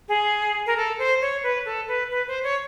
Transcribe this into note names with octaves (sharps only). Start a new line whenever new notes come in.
G#4
A#4
A4
C5
C#5
B4
A4
B4
B4
C5
C#5